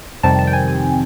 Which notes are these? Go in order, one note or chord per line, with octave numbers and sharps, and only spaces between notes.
F2 C3 D#3 G3 C4 A5
A5
G5
G#5
G#5